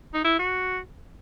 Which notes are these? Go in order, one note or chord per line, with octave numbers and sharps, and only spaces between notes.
D#4
E4
F#4